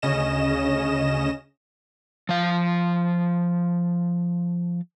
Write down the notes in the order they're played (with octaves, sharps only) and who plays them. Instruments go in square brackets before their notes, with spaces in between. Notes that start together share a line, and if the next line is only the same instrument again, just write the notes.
[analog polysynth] D2 C#3 C#4 D#5 A#6 E7
[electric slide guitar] F3 F5